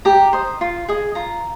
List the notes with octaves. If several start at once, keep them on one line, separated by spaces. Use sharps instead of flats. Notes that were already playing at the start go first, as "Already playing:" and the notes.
G4 A#5
C5 D#5
F4
G#4 D#5
F4 A#5